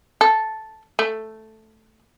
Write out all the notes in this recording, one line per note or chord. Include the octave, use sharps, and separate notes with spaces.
A4
A3